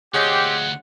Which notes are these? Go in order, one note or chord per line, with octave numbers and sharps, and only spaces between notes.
D2 C4 F4 G4 G#4 C#5 D#5 F#5